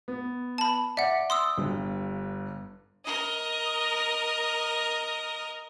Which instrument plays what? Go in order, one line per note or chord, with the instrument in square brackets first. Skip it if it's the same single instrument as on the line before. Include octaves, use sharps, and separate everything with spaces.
[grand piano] B3
[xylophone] A5 B5
[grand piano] D5 [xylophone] E5 F#5
[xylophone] C6 D#6 E6
[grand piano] G1 G2
[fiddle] A#4 D#5